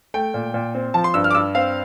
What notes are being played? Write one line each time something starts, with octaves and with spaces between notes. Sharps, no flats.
A3 G5
A#2
A#2
C4
F3 A5
C6
G2 E6
F6
D6
G2 E6
C4 F5